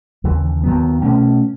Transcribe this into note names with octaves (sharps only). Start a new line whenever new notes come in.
D#2 C#3 E3
D#2 D#3 F#3 B3
B2 A3 C#4